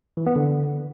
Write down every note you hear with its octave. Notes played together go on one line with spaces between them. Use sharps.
E3
B3
D3